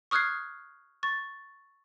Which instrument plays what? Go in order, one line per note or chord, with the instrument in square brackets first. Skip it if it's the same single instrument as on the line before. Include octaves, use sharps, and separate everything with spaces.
[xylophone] C#6 D#6 F6 F#6 G#6 C7
C#6 A6